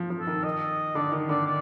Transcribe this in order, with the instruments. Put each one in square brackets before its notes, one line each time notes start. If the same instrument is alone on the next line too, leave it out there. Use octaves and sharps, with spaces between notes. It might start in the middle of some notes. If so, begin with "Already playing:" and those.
Already playing: [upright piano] F3
F3
[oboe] A4
[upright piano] D#3
[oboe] D#5
[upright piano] D3 [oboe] D5
[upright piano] D#3
[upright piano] D3 [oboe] D5
[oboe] D5